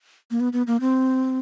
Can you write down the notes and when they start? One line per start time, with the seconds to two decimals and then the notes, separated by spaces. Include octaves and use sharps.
0.31 A#3
0.40 B3
0.53 B3
0.67 A#3
0.81 C4